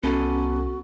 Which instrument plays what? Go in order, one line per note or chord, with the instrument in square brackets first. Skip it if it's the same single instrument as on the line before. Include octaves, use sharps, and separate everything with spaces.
[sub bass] C2 [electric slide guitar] B3 A4 G#5 [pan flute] C#4 [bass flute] F#4